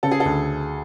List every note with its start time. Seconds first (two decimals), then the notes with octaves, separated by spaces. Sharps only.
0.03 C#3 A4
0.11 G#4
0.20 A4
0.25 D2